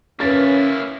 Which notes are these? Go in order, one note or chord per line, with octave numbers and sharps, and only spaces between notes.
A#3 C#4 E4 B4 A6